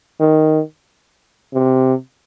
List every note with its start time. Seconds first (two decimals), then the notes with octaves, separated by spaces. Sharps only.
0.20 D#3
1.54 C3